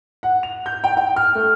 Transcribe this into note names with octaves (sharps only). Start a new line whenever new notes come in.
F#5
F7
G6
G5
G5
F6
A3